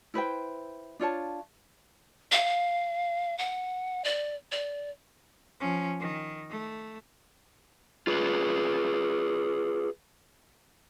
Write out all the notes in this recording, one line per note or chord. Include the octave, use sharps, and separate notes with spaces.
E4 B4 C5 G5
D4 F4 C#5 A5
F5
F#5
D5
D5
F3 C#4
D#3
A3
F4 G#4 B4